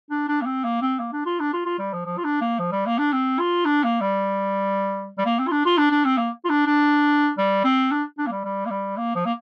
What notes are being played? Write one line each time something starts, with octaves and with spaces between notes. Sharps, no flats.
D4
D4
A#3
C4
A#3
C4
A#3
D4
F4
D4
F4
F4
G3
F3
F3
F4
D4
A#3
F3
G3
A#3
D4
C4
F4
D4
A#3
G3
G3
A#3
C4
F4
D4
F4
D4
D4
C4
A#3
F4
D4
D4
G3
C4
D4
D4
A#3
G3
G3
A#3
G3
A#3
F3
A#3